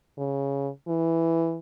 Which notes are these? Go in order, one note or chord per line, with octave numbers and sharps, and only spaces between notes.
C#3
E3